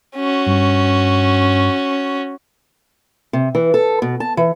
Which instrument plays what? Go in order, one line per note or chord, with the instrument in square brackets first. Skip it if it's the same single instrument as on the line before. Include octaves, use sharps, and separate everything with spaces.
[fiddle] C#4 F#4
[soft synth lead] G2
[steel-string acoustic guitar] C3
E3
A4
B2
A5
E3